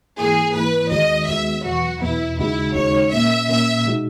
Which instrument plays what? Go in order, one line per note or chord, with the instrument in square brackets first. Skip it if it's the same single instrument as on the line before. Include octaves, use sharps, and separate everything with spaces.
[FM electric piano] G#2 E3 A#3 E4 [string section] G#4
[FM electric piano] G#2 E3 A#3 E4 [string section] B4
[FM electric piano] D#2 D#3 G#3 B3 F#4 [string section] D#5
[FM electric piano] D#2 D#3 G#3 B3 F#4 [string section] E5
[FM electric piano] E2 B2 F#3 B3 [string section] F#4
[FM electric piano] E2 B2 F#3 B3 [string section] E4
[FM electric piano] D#2 C#3 G#3 D#4 F#4 [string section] E4
[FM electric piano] D#2 C#3 G#3 D#4 F#4 [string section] C#5
[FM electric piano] A#2 A#3 C#4 [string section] E5
[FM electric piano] A#2 A#3 C#4 [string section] E5
[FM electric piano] B2 G#3 D#4 F#4